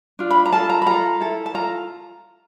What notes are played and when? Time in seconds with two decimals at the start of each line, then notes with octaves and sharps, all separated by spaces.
0.19 D4 F4
0.30 B5
0.46 A#5
0.52 F4 A4 A5
0.70 A#5
0.82 B5
0.86 F4 A4 A#5
1.21 E4 A4
1.46 A5
1.54 F4 A4 A#5